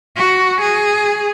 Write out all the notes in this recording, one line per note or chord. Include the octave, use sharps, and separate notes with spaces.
F#4
G#4